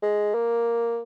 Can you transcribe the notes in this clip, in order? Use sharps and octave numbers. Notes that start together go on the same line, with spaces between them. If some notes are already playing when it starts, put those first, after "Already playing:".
G#3
A#3